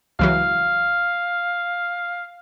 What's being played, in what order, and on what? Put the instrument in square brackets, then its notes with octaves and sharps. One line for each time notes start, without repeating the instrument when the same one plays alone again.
[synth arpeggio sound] C#2 E3 F#3 [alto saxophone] F5